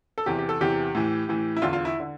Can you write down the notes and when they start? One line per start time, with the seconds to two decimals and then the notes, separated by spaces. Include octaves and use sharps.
0.18 A4
0.26 E2 C3 E3 G4
0.39 G4
0.49 A4
0.61 E2 C3 E3 G4
0.95 A2 E3
1.29 A2 E3
1.57 E4
1.62 E2 D3 F4
1.73 F4
1.85 E4
2.00 D3